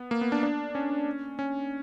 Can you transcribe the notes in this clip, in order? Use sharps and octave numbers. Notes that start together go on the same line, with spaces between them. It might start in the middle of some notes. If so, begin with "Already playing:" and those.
Already playing: B3
A#3
B3
D4
D4
C#4
C#4